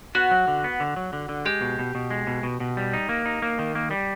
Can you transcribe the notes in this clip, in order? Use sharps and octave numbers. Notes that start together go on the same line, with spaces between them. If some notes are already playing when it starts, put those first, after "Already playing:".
B3 F#4
F#3
D3
B3
D3
F#3
D3
D3
G#3 G4
B2
B2
B2
G#3
B2
B2
B2
G3
D#4
A#3
D#4
A#3
D#3
A#3
G3